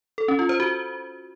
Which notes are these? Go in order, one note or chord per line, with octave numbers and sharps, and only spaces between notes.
A4
C#4
F4
C5
F#4